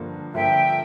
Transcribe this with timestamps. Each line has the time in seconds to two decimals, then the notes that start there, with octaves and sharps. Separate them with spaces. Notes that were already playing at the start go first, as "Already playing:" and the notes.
Already playing: G2 D3 F3 A#3
0.34 G2 D3 F3 A#3 E5 G5